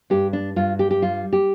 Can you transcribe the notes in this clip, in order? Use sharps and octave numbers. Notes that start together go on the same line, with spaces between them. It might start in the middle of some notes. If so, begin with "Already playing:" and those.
G2 G4
D4
G2 F4
G4
G4
G3 F4
G4